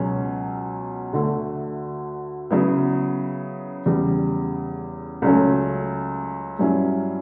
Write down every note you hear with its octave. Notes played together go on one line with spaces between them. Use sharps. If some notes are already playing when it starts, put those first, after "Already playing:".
Already playing: C#2 B2 F#3 C#4
D2 D3 A3
C#3 F#3 B3 E4
E2 C#3 G3
C#2 C#3 F#3 A3 C#4
G2 F#3 C#4 E4